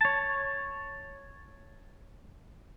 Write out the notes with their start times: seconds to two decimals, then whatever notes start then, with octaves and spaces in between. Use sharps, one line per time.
0.01 C#5 A5